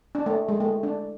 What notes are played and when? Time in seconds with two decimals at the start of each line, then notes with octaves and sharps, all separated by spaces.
0.15 D4
0.26 A3
0.49 G#3
0.60 A3
0.83 D4